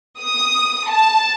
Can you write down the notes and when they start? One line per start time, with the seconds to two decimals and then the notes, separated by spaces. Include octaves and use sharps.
0.20 D#6
0.89 A5